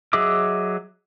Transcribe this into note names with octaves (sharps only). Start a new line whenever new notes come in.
F#3 G#4 D#5 E5 D6